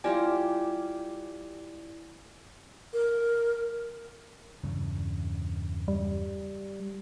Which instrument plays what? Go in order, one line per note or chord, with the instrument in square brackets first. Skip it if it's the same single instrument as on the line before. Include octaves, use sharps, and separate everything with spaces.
[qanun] G3 F4 G4 [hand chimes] E4 D5 G#5
[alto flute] A#4
[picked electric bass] E2 G2 C#3
[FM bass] G3